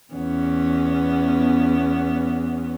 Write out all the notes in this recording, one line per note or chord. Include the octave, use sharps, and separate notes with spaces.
E2 B3 C#4